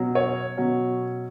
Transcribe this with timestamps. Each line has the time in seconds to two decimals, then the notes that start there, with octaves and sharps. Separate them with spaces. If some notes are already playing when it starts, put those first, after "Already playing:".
Already playing: B2 F#3 C#4
0.15 C#5
0.57 B2 F#3 C#4